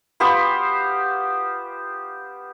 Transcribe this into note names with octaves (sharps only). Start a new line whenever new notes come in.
B3 F4 G4 C5